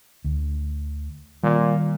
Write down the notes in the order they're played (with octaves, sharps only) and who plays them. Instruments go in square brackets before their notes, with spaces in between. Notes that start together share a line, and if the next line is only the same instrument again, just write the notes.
[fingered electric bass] D2
[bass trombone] A#2 [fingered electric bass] D#3 G3